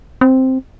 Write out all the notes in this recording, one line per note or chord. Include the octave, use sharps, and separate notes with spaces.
C4